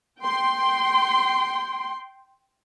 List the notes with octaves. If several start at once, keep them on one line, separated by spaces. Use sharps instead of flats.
G5 C6